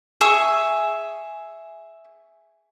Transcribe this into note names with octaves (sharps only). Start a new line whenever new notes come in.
G#4 E5 C#6